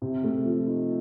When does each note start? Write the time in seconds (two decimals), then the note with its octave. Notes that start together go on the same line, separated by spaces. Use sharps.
0.02 C3
0.24 A3
0.45 F3
0.67 D#4